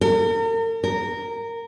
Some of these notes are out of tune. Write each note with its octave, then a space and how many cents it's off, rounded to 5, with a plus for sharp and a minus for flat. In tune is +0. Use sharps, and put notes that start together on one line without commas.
A#4 -40
A#4 -10